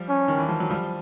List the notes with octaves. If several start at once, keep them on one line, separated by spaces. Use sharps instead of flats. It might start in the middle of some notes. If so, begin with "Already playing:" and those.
Already playing: F3 G3
C#4
D#3
E3
F3
F#3
F3 G3